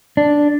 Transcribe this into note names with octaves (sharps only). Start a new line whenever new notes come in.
D4